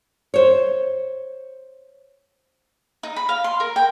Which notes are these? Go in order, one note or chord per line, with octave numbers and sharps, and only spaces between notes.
C5 C#5
D#4
B5
F5
C6
A#4
G5